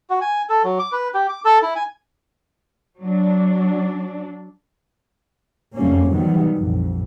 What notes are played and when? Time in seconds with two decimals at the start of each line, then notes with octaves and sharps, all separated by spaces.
0.10 F#4
0.21 G#5
0.49 A4
0.64 F#3
0.79 D6
0.92 B4
1.14 G4
1.29 D6
1.45 A4
1.62 E4
1.75 G#5
3.00 F#3 D4
5.76 F1 F#2 G3 A3 A#3 C#4
6.10 C3 D#3 E3 F#3 G3 B3
6.56 A#1 F2